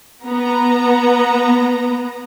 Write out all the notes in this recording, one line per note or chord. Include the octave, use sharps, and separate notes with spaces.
B3 A#5